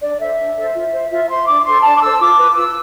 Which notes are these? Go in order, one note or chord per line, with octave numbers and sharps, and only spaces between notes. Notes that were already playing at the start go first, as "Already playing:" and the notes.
D4 D5
A4 C5 E5
D4
A4 C5
F4
C5
F4 E5
C5 C6
D4 D6
A4 C5 C6
D4 A5
D6
A4 C5 E6
F4 D6
B4
F4 E6